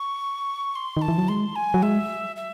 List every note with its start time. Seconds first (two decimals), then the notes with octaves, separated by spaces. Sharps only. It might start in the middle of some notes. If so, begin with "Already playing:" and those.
Already playing: C#6
0.75 C6
0.97 D#3 A5
1.08 E3
1.18 F#3
1.29 G#3 C6
1.56 G#5
1.74 F#3
1.83 G#3 E5
2.36 E5